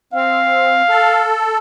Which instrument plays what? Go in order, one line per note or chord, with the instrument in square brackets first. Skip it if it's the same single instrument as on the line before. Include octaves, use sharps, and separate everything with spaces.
[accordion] C4 [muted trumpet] F5
[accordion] A4